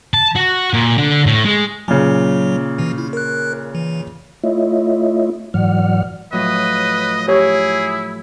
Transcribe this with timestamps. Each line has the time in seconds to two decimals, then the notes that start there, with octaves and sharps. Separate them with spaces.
0.14 A5
0.35 F#4
0.74 A#2
0.98 D3
1.26 A2
1.45 G#3
1.88 A#2 C#3 F#3
2.78 B2 E3
2.98 E4
3.13 A#4 F#6
3.75 E3
4.44 A3 E4 F4 C#5 D#5 E5
5.54 G#2 E3 F#3 D5 F#5 F6
6.33 A2 F3 F#3 B4 D#5
7.28 E4 G4 G#4 C#5